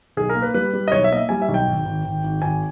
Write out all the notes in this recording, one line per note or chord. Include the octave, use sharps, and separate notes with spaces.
B1 G#4
A#4
A#3
B4
G3 B4
G3
D#5
B1 C#5
E5
A#3 D#5
E5
G3 G#5
E5
B1
G5
G#1
G#1
G#1
G#1
G#1 G#5